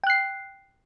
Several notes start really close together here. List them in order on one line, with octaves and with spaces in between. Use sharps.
G5 F#6 C7